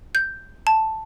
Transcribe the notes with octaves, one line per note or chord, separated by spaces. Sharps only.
G6
A5